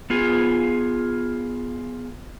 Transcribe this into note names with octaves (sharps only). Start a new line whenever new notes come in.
B3 F4 G#4